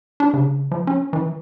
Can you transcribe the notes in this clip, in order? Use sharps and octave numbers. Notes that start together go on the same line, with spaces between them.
D4
C#3
F3
C#4
E3